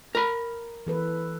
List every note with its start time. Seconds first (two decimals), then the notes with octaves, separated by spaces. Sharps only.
0.15 A#4 B5
0.87 E3 A4 B4